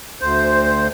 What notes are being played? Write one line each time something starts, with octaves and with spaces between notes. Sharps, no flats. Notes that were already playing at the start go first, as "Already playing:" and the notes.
D2 C5